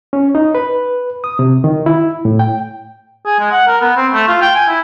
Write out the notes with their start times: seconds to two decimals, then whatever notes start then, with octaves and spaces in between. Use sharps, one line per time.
0.13 C#4
0.35 D#4
0.55 B4
1.24 D#6
1.39 C3
1.64 D#3
1.86 E4
2.25 A2
2.39 G5
3.26 G#4
3.39 G#3
3.52 F#5
3.67 A#4
3.81 B3
3.96 C4
4.13 A3
4.28 F4
4.41 G5
4.55 G#5
4.68 E4